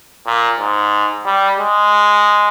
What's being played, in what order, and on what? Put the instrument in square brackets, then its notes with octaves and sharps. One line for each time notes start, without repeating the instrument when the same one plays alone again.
[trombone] A#2
G#2
G3
G#3